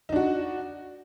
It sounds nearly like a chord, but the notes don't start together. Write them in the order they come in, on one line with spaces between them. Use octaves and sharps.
D#4 D4 F#4